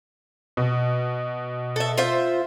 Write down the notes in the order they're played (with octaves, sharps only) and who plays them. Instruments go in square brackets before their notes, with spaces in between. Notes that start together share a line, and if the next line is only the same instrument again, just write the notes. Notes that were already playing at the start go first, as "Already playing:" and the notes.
[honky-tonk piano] B2
[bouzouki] A4 E5
F4 C5 E5